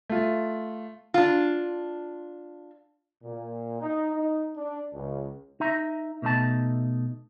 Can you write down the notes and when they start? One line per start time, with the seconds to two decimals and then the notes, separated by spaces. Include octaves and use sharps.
0.10 A3 F4
1.14 D4 F4
3.23 A#2
3.81 D#4
4.13 D#4
4.57 D4
4.93 C#2
5.60 D#4 E5 A#5
6.22 B2 A3 D#4 A5